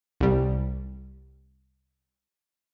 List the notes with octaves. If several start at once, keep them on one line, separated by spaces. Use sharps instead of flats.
C2 G3